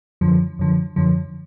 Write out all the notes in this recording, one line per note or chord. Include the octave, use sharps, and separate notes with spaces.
F#2 D3 F3
F#2 D3 F3
F#2 D3 F3